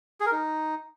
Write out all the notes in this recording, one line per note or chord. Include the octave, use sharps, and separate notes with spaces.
G#4
A#4
D#4